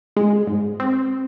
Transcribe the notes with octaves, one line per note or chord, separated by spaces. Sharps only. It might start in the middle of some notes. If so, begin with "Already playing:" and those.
G#3
G#2
C4